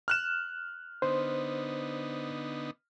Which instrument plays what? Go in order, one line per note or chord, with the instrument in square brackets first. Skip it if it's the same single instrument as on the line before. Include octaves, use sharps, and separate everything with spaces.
[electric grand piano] F6 F#6 E7
[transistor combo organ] D3 B3 D#4 [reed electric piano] C5